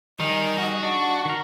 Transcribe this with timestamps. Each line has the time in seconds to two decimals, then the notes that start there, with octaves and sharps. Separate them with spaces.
0.20 D#3 G3 G#4 D#5
0.58 F#4
0.83 D4 C#6
1.25 D#3 A#4